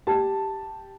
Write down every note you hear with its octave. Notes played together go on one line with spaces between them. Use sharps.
G4 A5